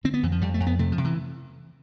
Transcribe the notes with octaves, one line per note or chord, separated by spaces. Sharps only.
D3 C4
B3
F2 E3
F3
F2 G3
A3
F2
B3
C3 A3
F3
C3
E3